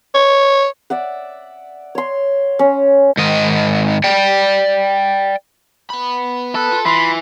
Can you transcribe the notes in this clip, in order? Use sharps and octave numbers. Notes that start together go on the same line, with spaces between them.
C#5
D5 E5 F#5
C#5 C6
C#4
G#2 D#3 D#5
D5 G5
B3 B5
A4 B4
F4
E3 B5 C6